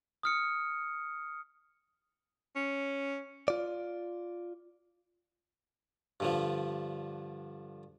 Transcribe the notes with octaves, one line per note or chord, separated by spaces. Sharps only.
D#6 F6 C#7
C#4
F4 D5
G2 D3 F3